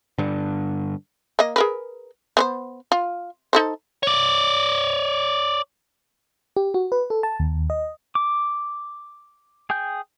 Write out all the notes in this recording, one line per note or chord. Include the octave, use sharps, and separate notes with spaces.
G2 D3
A#3 D#5
G#4 A#4 B4
B3 B4 C5
F4
D#4 A4 C5
C#5 D5
G4
F#4
B4
A4
A5
D#2
D#5
D6
G#4 G5 G#5 G6